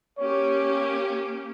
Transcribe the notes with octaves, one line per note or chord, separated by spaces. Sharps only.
A#3 C#4 G4 C#5